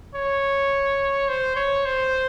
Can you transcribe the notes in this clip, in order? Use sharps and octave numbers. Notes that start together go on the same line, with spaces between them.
C#5
C5
C#5
C5